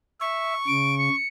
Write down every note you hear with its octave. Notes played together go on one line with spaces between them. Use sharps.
E5 C#6
C#3 D7
C#7